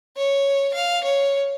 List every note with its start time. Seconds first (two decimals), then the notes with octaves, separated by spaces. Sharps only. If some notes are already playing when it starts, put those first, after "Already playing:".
0.17 C#5
0.74 F5
1.04 C#5